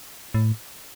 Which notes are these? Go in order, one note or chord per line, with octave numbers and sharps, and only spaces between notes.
A2